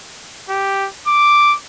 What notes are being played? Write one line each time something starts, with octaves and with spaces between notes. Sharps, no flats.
G4
D6